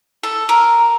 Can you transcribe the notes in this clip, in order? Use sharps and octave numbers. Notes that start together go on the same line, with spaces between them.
A4
A#4